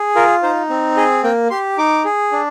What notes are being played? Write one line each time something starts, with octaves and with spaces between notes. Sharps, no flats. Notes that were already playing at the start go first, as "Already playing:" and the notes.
Already playing: G#4
F4 A#4
D#4 C5
C4
G#4 D#5
A#3 G5
G4 C6
D#4 D6
G#4
D4